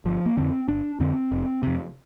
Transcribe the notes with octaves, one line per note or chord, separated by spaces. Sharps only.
G1 F3
A#3
F2 D3 C4
G1 D4
F2 D3 C4
F1
F2 C3